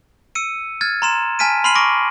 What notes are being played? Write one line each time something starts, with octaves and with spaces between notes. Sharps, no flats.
E6 C#7 D#7
F6 G#6 A6
A#5 C6 E7
G#5 A5 F6 B6 D7 D#7
B5 C6 F6 C7 D#7 F#7
C#6 D6 A#6 D7